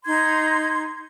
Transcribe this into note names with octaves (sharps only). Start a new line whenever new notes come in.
D#4 C6 G#6